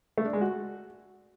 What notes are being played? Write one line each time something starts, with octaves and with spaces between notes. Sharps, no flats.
A3
D4
G#3
F#4